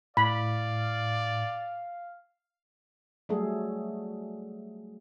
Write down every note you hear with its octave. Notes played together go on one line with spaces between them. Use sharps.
A2 D5 F5 B5
F#3 G3 A3 G#4 A4